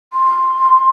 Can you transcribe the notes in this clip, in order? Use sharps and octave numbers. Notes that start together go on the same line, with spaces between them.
C6